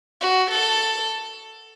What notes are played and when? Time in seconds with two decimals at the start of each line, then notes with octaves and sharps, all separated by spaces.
0.21 F#4
0.50 A4